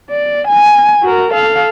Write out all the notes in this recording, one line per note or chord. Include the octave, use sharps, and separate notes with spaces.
D5
G#5
F#4 A#4
A4 F5